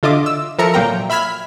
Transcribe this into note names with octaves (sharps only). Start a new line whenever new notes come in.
D3 F4 D#5 E5 D6
E6
F3 A4 A#4 E5 A#5 C#7
A#2 F#3 A#3 A#4 G5 A#5
E5 B5 F6 G#6 B6